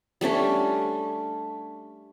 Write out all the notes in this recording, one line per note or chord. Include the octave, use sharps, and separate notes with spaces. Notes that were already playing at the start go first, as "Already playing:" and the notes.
G3 A3 C#4 D4